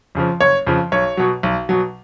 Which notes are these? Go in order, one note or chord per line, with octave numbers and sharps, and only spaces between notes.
F2 C#3 F3
F#1 C#5
F2 C#3 F3
B1 C#5
B2 F#3
B1
B2 F#3